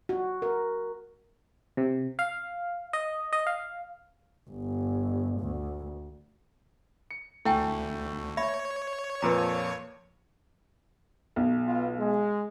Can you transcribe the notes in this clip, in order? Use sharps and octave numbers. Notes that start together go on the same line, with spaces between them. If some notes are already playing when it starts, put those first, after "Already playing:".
F#4
A#4
C3
F5
D#5
D#5
F5
G1
D2
C#7
D2 A3 E4 G5 G#5
C#5 E5 B5
F2 A#2 F3 B4 A#5
A5
B1
B3 F4
G#3